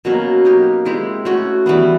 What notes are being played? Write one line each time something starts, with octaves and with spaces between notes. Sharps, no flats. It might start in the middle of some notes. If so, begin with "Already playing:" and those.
B2 F#3 A#3 C#4
A#3 D#4 G4
G#3 C4 E4 G4
A3 C#4 F#4
E3 G3 B3